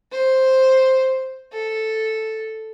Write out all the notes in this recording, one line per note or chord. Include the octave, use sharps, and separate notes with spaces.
C5
A4